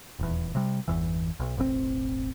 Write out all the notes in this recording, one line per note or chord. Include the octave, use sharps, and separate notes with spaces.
D#1 E2
C3 G3
G1 E2 E3
B1
E1 A1 A2 C4